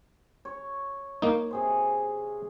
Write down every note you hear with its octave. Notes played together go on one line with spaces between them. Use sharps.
C#5
A#3 D#4
C3 G#4 C5